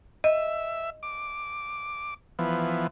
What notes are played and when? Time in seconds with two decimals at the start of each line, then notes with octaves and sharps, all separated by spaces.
0.24 D#5 E5
1.03 D6
2.39 E3 F3 B3